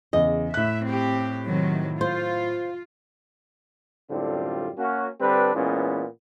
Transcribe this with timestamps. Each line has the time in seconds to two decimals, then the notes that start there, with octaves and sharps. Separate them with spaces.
0.13 E2 C#3 D#5
0.54 A2 E5 F#6
0.86 C4 G4
1.47 C3 D#3 F#3
2.01 F4 C5
4.10 F#2 A2 D3 G3 C4 F4
4.78 A#3 C#4 F#4
5.21 D3 G3 C4 D4 B4
5.55 A#2 E3 G#3 B3 C#4